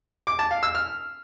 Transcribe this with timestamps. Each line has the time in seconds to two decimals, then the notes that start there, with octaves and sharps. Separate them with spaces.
0.27 D6
0.39 A5
0.51 F5
0.63 E6
0.75 F6